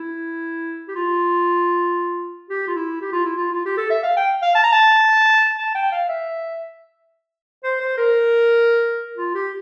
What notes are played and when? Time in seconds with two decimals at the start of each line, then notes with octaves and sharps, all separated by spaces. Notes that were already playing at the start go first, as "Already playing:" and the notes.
Already playing: E4
0.88 G4
0.95 F4
2.50 G4
2.68 F4
2.75 E4
3.01 G4
3.12 F4
3.25 E4
3.37 F4
3.53 F4
3.66 G4
3.77 A4
3.90 E5
4.03 F5
4.17 G5
4.42 F5
4.55 A5
4.63 A#5
4.72 A5
5.58 A5
5.75 G5
5.92 F5
6.09 E5
7.64 C5
7.81 C5
7.98 A#4
9.17 F4
9.34 G4